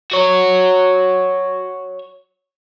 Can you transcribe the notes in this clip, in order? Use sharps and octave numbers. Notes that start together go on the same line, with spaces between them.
F#4 C#5